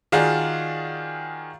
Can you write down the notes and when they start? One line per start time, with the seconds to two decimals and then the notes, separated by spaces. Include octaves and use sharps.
0.12 D#3 F4 F#4 G#4 D5